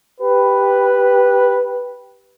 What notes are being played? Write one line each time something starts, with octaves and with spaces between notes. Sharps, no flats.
G4 B4